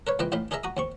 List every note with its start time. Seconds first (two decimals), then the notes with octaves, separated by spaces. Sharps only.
0.07 A#4 B4 C#5
0.19 C#2 E3 A#3 B4 D#5 G5
0.32 A1 A2 D#4 F5 B5
0.51 D#4 G#4 A#4 D#5 E5 A#5
0.64 F#4 A#5 D#6
0.77 D#2 C4 C#6